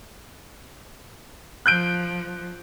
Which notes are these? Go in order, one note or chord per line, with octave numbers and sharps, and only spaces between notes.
F3 F#6 G6 D7